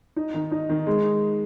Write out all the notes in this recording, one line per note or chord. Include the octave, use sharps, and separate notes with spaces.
D#4
D#3
D#4
D#3
G#3